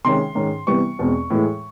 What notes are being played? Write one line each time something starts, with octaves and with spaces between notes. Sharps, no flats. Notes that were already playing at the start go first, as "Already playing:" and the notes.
C3 D#3 G#3 C#4 C6
G#2 D#3 G#3 C#4
C3 E3 G3 B3 C#6
E2 B2 G#3 C4
A2 E3 G#3